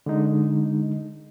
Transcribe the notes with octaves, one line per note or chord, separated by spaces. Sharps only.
D3 G#3 D#4